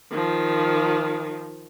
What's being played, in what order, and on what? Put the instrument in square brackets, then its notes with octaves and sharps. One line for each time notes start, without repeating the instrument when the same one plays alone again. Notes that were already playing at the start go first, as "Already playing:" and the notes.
[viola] D#3 F3